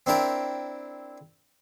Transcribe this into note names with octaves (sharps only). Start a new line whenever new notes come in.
C4 D4 E4 A#4 G5